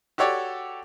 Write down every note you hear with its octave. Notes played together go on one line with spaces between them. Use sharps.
F#4 G4 A4 C#5 D5